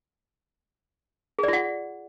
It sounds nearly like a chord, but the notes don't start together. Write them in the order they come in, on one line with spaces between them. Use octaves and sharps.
G#4 D5 F4 F#5